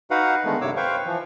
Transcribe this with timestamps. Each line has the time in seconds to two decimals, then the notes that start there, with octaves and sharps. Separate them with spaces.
0.11 D#4 F#4 B4 F5 F#5
0.45 D3 D#3 G#3 A3 B3
0.61 G2 C3 C#5 D6 E6
0.77 B4 C5 F5 G5 C#6
1.06 E3 F3